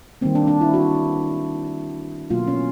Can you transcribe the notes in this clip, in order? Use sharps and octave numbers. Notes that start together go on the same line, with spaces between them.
D#3 G3 A#3 C4
D4
D4
E4
F#4
B2 F#3 A#3 F4
C#4